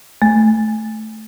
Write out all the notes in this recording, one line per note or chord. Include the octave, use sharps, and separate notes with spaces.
A3